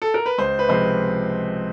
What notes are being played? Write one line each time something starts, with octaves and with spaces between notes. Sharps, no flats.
A4
A#4
B4
C#2 C5
B4
C3 F3 G#3 C5